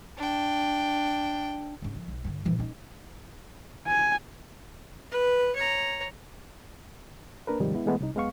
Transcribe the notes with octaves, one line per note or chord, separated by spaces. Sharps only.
D4 G5
G#2 C#3
F3
B1
G2 D3
A#2 E3
C#4 D#4
G#5
B4
C#5 A#5
A#3 D4 A#4 B4
D#2 G#2 C3 D#3 F3 G3
G#3 B3 E4
B2 E3 G#3 A3 B3
C2 C3 D#4
F#2 G#3 B3 F5 C#6